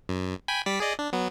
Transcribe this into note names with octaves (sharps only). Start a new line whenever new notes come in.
F#2
G5 G#5 B5
G3 D5 B6
G#4 D5 D#5
D4
F#3 B3